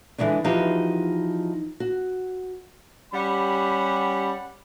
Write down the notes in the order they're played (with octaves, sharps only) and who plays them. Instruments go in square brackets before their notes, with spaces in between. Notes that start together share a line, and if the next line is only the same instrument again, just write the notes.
[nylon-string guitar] D3 E3 G#3 C#4 D4
E3 F3 D#4 E4 F#4 G4
F#4
[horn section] G3 C#4 G4 F#5 B5